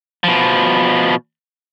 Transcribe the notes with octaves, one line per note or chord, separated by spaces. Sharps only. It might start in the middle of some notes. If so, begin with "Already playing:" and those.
B2 F3